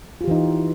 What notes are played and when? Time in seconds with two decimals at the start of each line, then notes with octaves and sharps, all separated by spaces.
0.21 F4
0.24 G4
0.28 E3
0.31 D#4